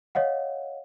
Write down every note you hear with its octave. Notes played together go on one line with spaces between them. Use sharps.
C#5 D#5 F5 F#5